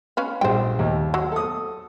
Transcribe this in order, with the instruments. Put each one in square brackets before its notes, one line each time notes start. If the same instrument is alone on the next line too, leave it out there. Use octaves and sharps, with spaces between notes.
[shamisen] C#4 B4 F5
[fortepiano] A#1 G3 [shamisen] C5 G5
[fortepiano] D#2
[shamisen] F#3
[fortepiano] A4 D#6